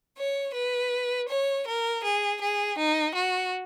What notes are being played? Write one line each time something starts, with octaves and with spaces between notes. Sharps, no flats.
C#5
B4
C#5
A#4
G#4
G#4
D#4
F#4